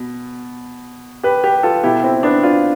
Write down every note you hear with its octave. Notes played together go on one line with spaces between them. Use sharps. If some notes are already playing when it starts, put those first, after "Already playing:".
Already playing: B2
G4 B4
G4 B4
F4 A4
B2 E4 G4
C4 E4
B3 D4
D4 F4